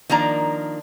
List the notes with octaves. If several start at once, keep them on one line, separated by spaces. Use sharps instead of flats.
D#3 F3 A#3 D4 A#5